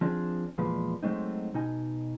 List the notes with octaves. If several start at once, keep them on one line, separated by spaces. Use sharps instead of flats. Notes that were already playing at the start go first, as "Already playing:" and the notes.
F3 C4 D4 G#4
E2 A#2 F3 G#3 B4
F#3 G#3 A3 C4 D#4
B2 D#4 G#5